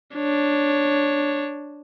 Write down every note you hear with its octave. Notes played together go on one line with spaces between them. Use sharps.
D4 C#5